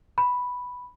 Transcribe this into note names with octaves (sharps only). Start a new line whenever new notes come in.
B5